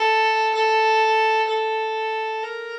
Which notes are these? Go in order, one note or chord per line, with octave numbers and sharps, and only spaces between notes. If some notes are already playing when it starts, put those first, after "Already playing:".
Already playing: A4
A4
A4
A#4